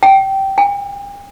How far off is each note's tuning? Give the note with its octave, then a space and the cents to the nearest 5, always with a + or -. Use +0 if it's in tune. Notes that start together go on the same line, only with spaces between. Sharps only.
G5 -15
G5 +45